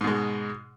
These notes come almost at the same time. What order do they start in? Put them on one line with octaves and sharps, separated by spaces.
G#2 B2 G#3